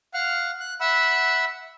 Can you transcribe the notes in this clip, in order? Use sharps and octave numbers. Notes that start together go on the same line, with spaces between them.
F5 F#5 F6
F#6
E5 F#5 B5 E6